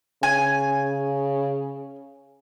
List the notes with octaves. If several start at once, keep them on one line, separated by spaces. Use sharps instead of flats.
C#3 G#5